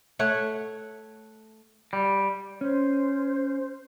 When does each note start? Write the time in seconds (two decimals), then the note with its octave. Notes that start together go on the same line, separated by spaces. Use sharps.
0.19 A3 C#5 F#5
1.93 G3
2.61 C#4 C5